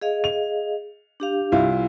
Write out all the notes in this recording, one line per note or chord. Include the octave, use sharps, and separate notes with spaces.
G#4 D#5 F5
F7
D4 G4 F5
C2 E4 F4